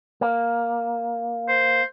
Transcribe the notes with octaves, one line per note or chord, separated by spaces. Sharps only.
A#3
C5